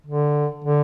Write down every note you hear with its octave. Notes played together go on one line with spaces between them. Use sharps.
D3
D3